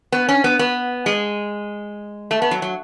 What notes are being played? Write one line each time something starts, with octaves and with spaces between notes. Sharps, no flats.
B3
C#4
B3
B3
G#3
A3
B3
F#3
F#3